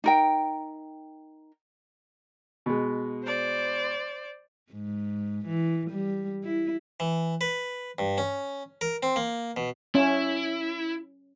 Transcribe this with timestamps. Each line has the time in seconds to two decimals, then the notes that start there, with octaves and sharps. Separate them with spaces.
0.04 D#4 A#4 G5
2.66 B2 G#3
3.24 C5 D5
4.72 G#2
5.46 E3
5.90 G3
6.44 E4
7.00 E3
7.41 B4
7.99 G2
8.18 C#4
8.81 A#4
9.03 C4
9.16 A#3
9.57 B2
9.95 C#4 E4